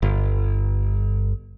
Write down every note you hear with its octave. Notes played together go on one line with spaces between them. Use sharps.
G1